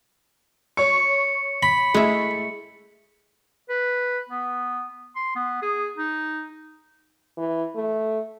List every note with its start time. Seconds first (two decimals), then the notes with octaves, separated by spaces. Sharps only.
0.77 C#5 C#6 C#7
1.63 B5
1.94 G#3 A3 E4
3.69 B4
4.29 B3
5.16 C6
5.35 B3
5.62 G#4
5.97 D#4
7.38 E3
7.75 A3